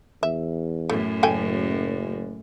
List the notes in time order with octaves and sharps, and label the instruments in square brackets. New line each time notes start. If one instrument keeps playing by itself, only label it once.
[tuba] E2 [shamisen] E5
[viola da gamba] F#2 A2 [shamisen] A3
[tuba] F#1 [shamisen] A3 G5 G#5